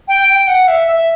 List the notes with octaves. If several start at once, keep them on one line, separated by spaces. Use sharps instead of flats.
G5
G5
F#5
E5
E5